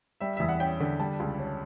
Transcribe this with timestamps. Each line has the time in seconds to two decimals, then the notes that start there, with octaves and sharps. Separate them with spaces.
0.21 G3 E5
0.37 E2 E5
0.48 F#5
0.60 C#4 G5
0.80 D3
1.00 G3 A5
1.20 C#2
1.39 C#4